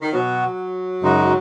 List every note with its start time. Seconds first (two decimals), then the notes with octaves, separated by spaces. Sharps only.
0.02 D#3
0.13 B2 F#3 B3 F#4
1.02 F#2 C#3 G#3 D#4 F#4